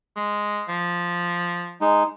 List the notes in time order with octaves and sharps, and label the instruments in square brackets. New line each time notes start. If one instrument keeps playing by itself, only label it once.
[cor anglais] G#3
F3
[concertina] G#3 D#4